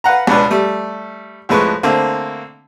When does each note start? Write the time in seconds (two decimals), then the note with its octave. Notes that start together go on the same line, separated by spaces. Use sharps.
0.04 B4 F5 F#5 A#5
0.27 C#2 B2 D4 B4
0.51 G3 A3
1.49 F2 A2 G#3 B4 C#6
1.83 D3 A3 A#3 C4